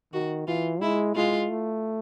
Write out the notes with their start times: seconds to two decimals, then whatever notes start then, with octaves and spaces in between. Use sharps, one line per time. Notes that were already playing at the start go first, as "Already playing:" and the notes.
0.13 D#3 F#4
0.48 E3 F4
0.82 G#3 E4
1.16 G#3 F4
1.50 A3